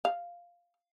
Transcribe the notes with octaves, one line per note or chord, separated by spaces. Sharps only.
F5